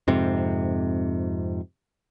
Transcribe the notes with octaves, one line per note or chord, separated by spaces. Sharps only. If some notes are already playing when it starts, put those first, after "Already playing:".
F2 G#2 C3